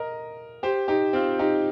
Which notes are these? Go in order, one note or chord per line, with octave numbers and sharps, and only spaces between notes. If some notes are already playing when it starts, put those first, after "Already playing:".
Already playing: A#4 D#5
G4 C5
D#4 G4
C4 F4
D#4 G4